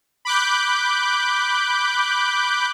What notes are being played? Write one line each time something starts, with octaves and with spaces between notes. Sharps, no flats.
B5 D6 F#6 G6